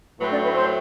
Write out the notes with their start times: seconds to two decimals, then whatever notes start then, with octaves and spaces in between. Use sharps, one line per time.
0.19 A2 F#3 A3 C4 B4
0.31 D4 D5
0.43 B4 B5
0.54 C5 C6